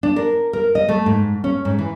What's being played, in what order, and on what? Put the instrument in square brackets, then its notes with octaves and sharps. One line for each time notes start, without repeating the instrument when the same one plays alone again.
[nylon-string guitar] D4
A#4
A#4
D#5
A3
G#2
C#4
G#2
E3